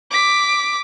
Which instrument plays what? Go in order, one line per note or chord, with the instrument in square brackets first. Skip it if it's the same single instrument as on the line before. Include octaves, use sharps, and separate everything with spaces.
[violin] D6 B6